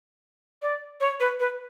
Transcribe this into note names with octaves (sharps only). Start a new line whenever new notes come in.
D5
C#5
B4
B4